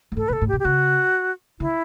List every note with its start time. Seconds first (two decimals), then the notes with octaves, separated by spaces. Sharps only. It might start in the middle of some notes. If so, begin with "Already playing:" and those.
0.12 G2
0.17 A2 A4
0.28 B2 B4
0.33 A4
0.41 A2
0.48 G4
0.53 B2
0.59 G4
0.65 C#3 F#4
1.60 D3 E4